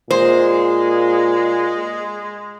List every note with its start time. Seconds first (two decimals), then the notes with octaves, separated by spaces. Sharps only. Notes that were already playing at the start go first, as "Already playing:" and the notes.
0.11 A#2 G#3 C5